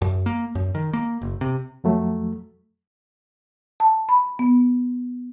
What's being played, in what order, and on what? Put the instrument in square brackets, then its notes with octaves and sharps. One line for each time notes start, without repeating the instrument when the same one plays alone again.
[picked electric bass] F#2
A#3
F#2
D#3
A#3
F#1
C3
[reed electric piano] F2 F#3 A3
[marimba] A5
B5
B3